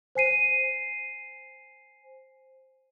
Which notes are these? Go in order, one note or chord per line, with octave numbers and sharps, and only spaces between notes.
C5 G#5 C7 D#7